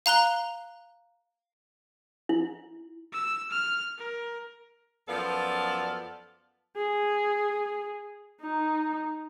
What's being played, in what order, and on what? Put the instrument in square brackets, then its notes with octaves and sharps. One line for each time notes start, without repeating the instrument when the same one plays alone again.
[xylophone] F5 A#5 F#6 G7
[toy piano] E4
[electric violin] E6
F6
A#4
[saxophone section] F#2 F3 B3 A4 D5 F5
[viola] G#4
D#4